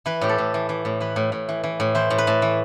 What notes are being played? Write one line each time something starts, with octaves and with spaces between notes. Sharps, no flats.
E3 B4
A2 G4
A4
A2
E3
E3
A2
E3 B4
A2
A2
E3
E3
A2
E3 C5
A2
B4
A2
E3